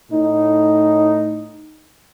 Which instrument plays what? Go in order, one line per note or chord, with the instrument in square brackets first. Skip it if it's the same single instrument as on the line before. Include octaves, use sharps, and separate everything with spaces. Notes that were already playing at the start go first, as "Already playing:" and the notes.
[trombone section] A2 D#4